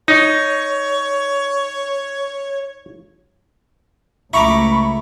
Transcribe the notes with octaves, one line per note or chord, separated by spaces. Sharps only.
D#4 C#5
C#2 A3 E4 A#5 B5 C#6 D6